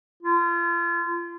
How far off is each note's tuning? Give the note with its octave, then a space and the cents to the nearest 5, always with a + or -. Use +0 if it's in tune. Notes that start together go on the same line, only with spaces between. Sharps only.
F4 -35